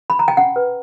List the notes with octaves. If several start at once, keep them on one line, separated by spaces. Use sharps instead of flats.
B5
A#5
G5
C#4 F#5
B4